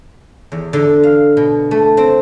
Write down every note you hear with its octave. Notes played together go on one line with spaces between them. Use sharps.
E2
D3
F5
B2
A3
C4